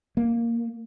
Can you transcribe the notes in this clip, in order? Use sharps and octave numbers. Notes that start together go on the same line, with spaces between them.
A#3